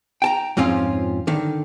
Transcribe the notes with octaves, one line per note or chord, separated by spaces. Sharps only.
G5 A5 A#5
F2 G#2 F3 C4 C#4 F4
D3 D#3